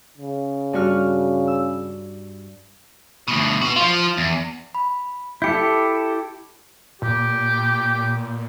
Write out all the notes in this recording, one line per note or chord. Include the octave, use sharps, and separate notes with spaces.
C#3
G2 F#4 F6
E6
D2 B2
B3 F#4
F3 F4
E2
B5
E4 G4 A4 G6 C#7
A#2 G4